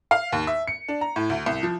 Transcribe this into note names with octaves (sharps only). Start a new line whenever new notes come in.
F5
D#2
E5
C#7
D4
A#5
A2
D2
C2
F3